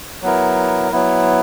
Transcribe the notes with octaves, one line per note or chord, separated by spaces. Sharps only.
F#3 B3 E4 A#4
F#3 B3 E4